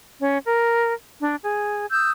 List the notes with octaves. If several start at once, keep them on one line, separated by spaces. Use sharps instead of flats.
C#4
A#4
D4
G#4
D#6 E6 G6